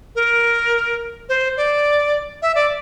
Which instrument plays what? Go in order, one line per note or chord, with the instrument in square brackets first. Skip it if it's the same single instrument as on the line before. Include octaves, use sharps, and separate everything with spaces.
[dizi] A#4
C5
D5
E5
D5